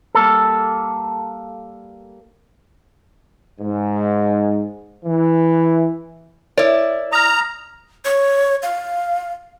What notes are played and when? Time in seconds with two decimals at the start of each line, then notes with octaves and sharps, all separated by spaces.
0.15 G3 A#3 A4
3.61 G#2
5.05 E3
6.57 E4 A#4 C#5 D5
7.13 A#5 D#6 F6
8.05 C#5
8.63 F5